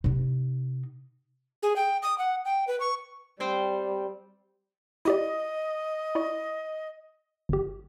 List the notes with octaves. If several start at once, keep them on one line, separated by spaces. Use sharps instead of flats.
C3 D#4
G#4
G5
D#6
F#5
G5
B4
C#6
G3 C4 C5 G5
E4 G4 D5 D#5
E4 D5 C#6
G1 G4